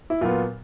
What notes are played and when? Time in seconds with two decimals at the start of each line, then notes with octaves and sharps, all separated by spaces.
0.10 E4
0.21 A#2 F#3 B3 F4